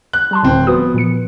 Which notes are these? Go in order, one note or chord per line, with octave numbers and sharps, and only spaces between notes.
F#6
G3 A5 C6
D1 C4
F3 B3 F#4 D#6
A#2 F3 C#7